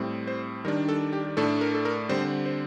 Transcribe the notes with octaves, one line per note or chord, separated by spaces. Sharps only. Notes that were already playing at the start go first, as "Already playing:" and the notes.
Already playing: A2 G3 C4
C5
D#3 G3 D4 A#4
A4
G4
A2 A3 D4 A4
A#4
A4
A#4
D3 G3 C4 C5
C5